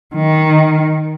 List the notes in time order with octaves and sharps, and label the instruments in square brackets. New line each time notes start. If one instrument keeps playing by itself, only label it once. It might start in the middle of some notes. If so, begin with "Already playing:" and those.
[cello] D#3